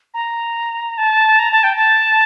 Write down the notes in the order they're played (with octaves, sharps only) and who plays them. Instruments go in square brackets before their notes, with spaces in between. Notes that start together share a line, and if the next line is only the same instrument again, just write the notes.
[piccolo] A#5
A5
A#5
A5
G5
A5